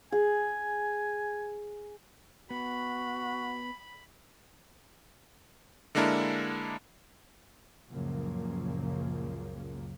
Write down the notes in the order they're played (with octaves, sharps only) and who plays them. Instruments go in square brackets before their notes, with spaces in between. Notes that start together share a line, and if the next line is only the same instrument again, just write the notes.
[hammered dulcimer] G#4 [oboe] G#5
[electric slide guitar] B3 [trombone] F#4 [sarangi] B5
[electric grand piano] D3 G#3 A#3 D4 E4 A#4
[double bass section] C#2 F#2 A#2 C#3 F3 A#3